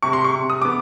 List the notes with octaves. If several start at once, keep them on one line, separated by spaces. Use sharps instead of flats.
C3 C#6
C6
C#6
C3
D#6
B3 D6